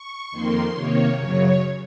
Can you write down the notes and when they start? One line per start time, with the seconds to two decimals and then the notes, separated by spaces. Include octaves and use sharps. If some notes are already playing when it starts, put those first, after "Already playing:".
Already playing: C#6
0.31 F2 D#3 A#3 C6
0.74 C3 D#3 A#3 C#5
1.16 F#2 C#3 F#3 C#5